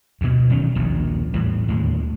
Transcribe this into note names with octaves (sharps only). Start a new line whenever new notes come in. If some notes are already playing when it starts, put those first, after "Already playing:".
D2 B2
E1 D#3 F#3 C#4
D#1 A#1 D#2
E2 A2 E3 G3
D#2 A2 D3 G#3